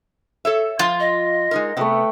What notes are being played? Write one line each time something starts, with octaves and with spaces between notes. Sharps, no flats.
A4 C#5 E5
F3 F4 C6
D#5
G#3 D#4 A#4
C3 A3 B3 B4 G5